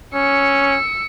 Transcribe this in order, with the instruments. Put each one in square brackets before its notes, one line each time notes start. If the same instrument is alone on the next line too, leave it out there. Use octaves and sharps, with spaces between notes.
[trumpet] C#4 [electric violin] E6 C#7